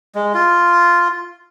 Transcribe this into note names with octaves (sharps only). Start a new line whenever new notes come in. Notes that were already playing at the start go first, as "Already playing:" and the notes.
G#3
F4